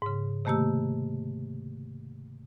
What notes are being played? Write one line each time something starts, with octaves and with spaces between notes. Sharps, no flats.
G#2 C#3
C3 D#3 A3 A#3 G4 E6